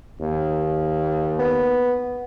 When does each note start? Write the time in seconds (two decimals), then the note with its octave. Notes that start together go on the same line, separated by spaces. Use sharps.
0.20 D#2
1.39 B3